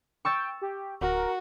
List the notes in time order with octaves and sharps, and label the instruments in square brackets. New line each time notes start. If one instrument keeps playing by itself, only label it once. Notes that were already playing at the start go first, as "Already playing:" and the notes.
[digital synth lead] G5 [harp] C#6 E6 A6
[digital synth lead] G4
[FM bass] D1 [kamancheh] F#4 [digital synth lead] A#4